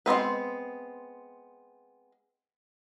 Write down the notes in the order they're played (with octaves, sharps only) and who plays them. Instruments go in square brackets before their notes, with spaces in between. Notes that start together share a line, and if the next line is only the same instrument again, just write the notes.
[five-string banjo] G#3 B3 C4 B4